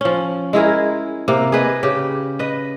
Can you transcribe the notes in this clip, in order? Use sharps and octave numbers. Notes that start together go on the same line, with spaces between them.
F3 C#4
G#3 E4 G#4 A#4
C3 A#3
G#4 B4 D#5
C#3 G4
B4 D#5